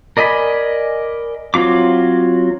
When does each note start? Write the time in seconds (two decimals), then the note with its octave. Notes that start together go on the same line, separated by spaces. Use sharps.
0.17 A#4 D5 D#5 G#5 B5
1.54 F#3 C4 F4 D6